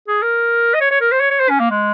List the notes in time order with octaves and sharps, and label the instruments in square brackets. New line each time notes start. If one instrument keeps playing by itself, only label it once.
[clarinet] G#4
A#4
D#5
C#5
C#5
A#4
C5
C#5
C#5
C5
C#4
A#3
G#3